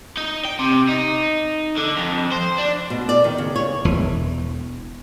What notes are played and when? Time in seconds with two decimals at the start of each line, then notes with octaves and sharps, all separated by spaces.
0.17 D#4
0.45 G5
0.59 C3
0.89 D#4
1.77 D3
1.97 F2
2.32 C5
2.58 D4
2.90 B2
3.09 D5
3.24 D#3
3.38 C#3
3.56 C#5
3.85 E1 E3